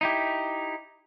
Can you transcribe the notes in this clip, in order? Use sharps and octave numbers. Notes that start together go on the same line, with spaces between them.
D#4 E4 G4